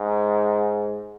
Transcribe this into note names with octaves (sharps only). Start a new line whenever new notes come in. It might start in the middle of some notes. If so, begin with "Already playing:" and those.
Already playing: G#2